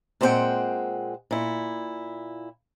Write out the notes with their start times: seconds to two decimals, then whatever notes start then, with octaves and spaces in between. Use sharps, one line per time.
0.21 A#2 G#3 C4 G4 F#5 G5
1.31 A#2 E4